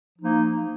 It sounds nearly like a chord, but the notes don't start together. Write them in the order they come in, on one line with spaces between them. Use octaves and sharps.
F3 D#4 A#3